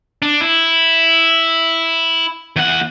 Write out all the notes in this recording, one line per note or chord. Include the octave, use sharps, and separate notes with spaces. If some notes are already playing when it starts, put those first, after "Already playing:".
D4
E4
E2 F#5